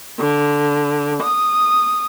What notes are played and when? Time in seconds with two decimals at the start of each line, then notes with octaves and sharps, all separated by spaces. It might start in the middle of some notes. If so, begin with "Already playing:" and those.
0.19 D3
1.23 D#6